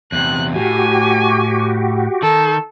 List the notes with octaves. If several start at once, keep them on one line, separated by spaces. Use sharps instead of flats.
E2 C3 F#6
A2 F#4 G4 G#5
D#3 A4